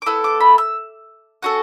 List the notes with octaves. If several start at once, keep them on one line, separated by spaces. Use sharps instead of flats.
D6
B3 E4 A4 E6
D6
B5
E6
C#4 F#4 A4 F#5